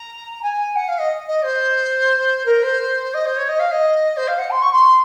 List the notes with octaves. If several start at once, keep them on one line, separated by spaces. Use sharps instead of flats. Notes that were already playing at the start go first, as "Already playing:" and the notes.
Already playing: A#5
G#5
F#5
F5
D#5
D#5
C5
A#4
C5
D#5
C5
C#5
D#5
F5
D#5
C5
F5
F#5
C6
C#6
C6